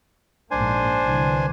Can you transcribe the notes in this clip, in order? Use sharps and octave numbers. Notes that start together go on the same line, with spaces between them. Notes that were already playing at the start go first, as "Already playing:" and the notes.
A#1 G#2 A#3 D4 C5 G#5
C2 D3 E3